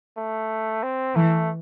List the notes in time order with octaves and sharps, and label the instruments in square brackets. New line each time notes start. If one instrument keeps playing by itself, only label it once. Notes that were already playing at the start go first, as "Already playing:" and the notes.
[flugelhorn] A3
C4
[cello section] E3 [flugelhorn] A3